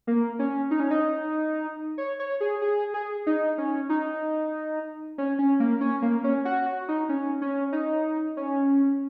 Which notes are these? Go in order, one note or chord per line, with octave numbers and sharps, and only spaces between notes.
A#3
C#4
D#4
C#4
D#4
C#5
C#5
G#4
G#4
G#4
D#4
C#4
D#4
C#4
C#4
A#3
C#4
A#3
C#4
F#4
F#4
D#4
C#4
C#4
D#4
C#4